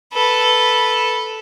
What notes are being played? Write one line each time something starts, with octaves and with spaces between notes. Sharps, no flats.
A4 B4